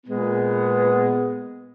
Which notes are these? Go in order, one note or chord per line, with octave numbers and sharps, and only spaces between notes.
A#2 G#3 B3